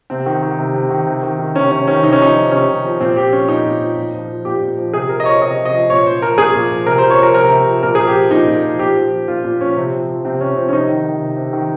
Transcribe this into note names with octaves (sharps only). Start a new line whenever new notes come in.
C3 C4
D#3
D#3
C3
C3
D#3
C3
D#3
D#3
C3 C#4
C3 C#4
D#3 C#4
C3 D#4
C#4
F3 D#4
F3
C3 C#4
C3
F3
A#2 C4
F3 G4
F3 C#4
A#2 D#4
A#2
F3
A#2
F3
F3
A#2 G4
A#2
F3
C3 G#4
F3 A#4
D#5
F3 C#5
C3 D#5
C3
D#5
F3
A#2 C#5
F3 C5
F3 A#4
A#2 G#4
A#2
F3
C3 A#4
F3 C5
C#5
F3 A#4
C3 A#4
C3
F3
A#2 A#4
F3 G#4
G4
F3
A#2 D#4
A#2
F3
A#2 G4
F3
F3
A#2 F4
A#2
F3 C#4
C3 C4
F3
F3
C3 C4
C3 C#4
F3 C4
C#4
C3 D#4
D#3
D#3
C3
C3
D#3